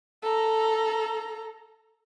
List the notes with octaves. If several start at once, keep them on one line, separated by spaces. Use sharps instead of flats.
A4 A#5